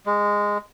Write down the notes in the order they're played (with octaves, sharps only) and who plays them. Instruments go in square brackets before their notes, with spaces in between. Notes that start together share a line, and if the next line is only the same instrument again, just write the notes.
[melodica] G#3